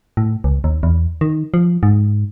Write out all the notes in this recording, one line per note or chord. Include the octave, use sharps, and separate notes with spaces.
A2
C#2
D#2
E2
D#3
F3
G#2